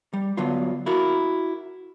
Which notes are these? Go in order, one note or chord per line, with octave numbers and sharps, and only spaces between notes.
G3
D3 F#3 B3 F4
E4 F#4 A#4